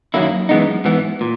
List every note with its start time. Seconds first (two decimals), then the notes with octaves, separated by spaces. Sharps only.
0.14 F#2 D#3 F#3 A#3 E4
0.49 F#2 E3 G#3 B3 D#4
0.85 G#2 E3 B3
1.21 A#2